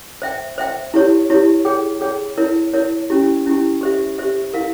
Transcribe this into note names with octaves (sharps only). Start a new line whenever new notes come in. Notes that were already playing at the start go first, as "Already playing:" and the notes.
C5 E5 G5
C5 E5 G5
E4 G4 C#5
E4 G4 C#5
G#4 C#5 G5
G#4 C#5 G5
E4 A#4 C#5
E4 A#4 C#5
C#4 E4 G4
C#4 E4 G4
G4 C5 E5
G4 C5 E5
E4 A#4 F5